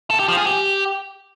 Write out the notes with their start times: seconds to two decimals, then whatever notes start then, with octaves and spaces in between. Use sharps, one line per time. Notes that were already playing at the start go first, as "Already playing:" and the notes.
0.10 A4
0.19 G4
0.28 F3
0.37 G#4
0.46 G4